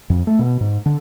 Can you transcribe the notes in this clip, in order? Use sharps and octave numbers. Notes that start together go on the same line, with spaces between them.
F2
A3
B2
G#2
D3